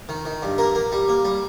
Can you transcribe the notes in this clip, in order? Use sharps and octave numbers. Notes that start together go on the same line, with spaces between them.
D#3
D#3
G2
A#3 A#4
A#3
G3
A#3
G3